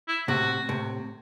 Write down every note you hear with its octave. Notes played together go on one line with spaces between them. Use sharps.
E4
A2 C3 F#4
A2 C3